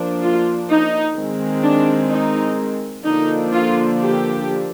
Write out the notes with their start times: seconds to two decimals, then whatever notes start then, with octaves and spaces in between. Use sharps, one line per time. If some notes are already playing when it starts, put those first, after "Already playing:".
Already playing: F3 A#3 D4
0.22 F4
0.69 D#4
1.16 D#3 G#3 C4
1.63 D4
2.10 D#4
3.05 D3 F3 A#3 D4 D#4
3.52 F4
4.00 G4